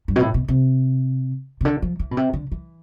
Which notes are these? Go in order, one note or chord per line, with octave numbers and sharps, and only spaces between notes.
G2
B2
A2
B2
C3
C3
D3
F3
E3
B2
C3
D3
E3